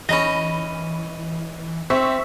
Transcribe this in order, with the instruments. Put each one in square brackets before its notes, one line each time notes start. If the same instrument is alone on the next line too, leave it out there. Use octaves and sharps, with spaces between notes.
[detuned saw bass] E3 [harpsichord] C#4 D#4 [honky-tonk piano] B5 A#6
[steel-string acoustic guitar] C4 [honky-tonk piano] E5 C#6